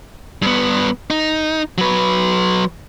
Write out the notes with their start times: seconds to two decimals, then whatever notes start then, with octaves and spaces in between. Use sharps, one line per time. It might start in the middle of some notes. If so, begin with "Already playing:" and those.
0.42 G2 B3
1.10 D#4
1.78 F#3 B4